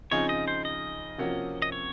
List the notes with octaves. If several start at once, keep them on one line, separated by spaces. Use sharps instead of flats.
C#3 F3 C4 D#4 G#4 C#5
D#5
C5
D#5
C3 F3 A#3 C#4 F#4
D#5
C#5